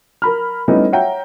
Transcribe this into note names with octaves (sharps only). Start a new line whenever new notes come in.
A#4 B5 F6
G3 A3 B3 C#4 D#4 E4
C#5 E5 F#5 G5 A#5